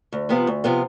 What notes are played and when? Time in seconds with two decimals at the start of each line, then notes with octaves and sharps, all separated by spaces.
0.12 D2
0.29 C3 F3 B3 F4
0.47 D2
0.64 C3 F3 B3 F4